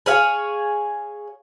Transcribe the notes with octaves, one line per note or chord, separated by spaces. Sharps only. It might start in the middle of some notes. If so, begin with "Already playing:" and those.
G#4 C#5 F5 G#5